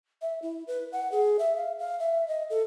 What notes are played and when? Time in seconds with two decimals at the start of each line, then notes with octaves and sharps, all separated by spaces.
0.22 E5
0.42 E4
0.67 B4
0.92 F#5
1.12 G#4
1.39 E5
1.57 F5
1.79 F5
2.00 E5
2.28 D#5
2.50 A4